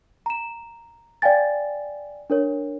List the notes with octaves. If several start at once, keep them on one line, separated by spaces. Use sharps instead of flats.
A#5 E7
D5 F5 G5 G#5 A6
D4 A#4 C#5